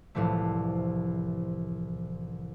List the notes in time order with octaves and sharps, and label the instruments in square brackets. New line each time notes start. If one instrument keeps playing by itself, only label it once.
[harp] C2 A2 E3 F3 A3